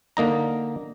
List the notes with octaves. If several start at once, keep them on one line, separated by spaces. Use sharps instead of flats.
D3 A#3 D#4 A#5